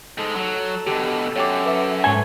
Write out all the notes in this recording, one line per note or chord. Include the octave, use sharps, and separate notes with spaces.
G#2 G#3 A4
F#3
B2 D3 G4
F#2 C#5 G5 D6
B4 E5
G#2 A4 C#5 G#5